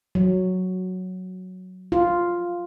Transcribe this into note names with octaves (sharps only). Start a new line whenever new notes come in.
F#3
F4